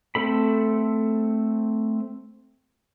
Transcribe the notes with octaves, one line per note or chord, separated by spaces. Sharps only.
A3 C4 A4 B5